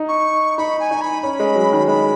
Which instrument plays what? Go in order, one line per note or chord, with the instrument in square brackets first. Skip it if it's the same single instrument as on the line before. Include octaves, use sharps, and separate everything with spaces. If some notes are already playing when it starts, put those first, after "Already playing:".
Already playing: [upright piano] D#4
[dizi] C#6
[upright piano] D#4 [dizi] B5
[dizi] G#5
[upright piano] D#4
[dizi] B5
[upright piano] C#4 [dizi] B5
[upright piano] G#3
F#3
D#3
[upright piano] G#3 [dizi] B5